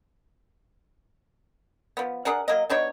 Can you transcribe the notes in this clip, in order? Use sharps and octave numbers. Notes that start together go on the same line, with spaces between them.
F3 B3
D4 G#4 A#4 F#5
F#3 A#3 A#4 D#5
B2 D4 D#4 C#5